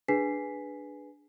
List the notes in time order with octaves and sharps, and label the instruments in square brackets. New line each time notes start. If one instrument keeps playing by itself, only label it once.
[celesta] D4 G#4 B4 G#5 B6 C7